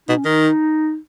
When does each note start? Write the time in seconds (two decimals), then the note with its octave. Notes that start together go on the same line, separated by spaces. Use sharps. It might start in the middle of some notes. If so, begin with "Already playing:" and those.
0.09 B2 D#4
0.18 C#4
0.25 D#3 D#4